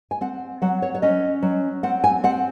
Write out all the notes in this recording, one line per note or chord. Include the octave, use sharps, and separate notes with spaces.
G#5
C4 F#5
F#3 F#5
C#5
C#5
C#4 D#5
F#3
C4 F#5
G#5
C4 F#5